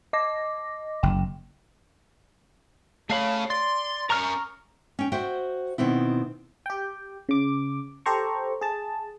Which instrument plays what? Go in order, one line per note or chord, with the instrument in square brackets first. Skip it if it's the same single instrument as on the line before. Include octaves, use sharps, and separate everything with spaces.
[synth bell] D#5 D6 A#6
[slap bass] F#1 [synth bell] G5
[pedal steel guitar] A3 F5 B5 [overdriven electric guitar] G#4 C#5
[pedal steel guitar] D5 [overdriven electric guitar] C6
[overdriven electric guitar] C#4 A#4 [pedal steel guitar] A#5 C#6 F6
[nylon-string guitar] C#4 G5
F#4 C5 E5 G5
B2 D#3 C4 E4
[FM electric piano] G4 G5
C#3 D6
G4 A4 C5 A#5 C#6
G#4 A5